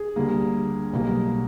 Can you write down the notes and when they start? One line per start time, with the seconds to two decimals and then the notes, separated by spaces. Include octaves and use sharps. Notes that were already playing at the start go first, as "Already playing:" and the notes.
Already playing: G#4
0.16 D2 D3 G3 A#3
0.93 B1 B2 G3 A#3